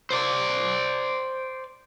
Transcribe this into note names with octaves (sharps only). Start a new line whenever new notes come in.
C5 D5